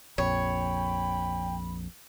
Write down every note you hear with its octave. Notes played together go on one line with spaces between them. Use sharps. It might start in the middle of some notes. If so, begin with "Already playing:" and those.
A#1 F2 C#5 G5 B5